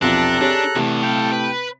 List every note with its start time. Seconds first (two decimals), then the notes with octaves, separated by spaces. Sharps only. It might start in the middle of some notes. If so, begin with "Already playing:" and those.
0.02 B1 E2 C3 F3 D4 A4 A#5 F#6
0.41 D4 G4 G#4 C#5
0.76 E2 A2 C3 E3 A5
1.03 A4 F5 G5
1.32 B4